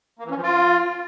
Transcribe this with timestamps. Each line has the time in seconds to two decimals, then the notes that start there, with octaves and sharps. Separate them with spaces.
0.19 A#3
0.25 E3
0.31 C#4
0.37 F3
0.42 F4